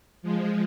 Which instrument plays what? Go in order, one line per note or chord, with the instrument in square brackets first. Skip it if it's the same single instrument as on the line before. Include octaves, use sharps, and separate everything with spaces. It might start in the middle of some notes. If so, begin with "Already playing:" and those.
[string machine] F3 G#3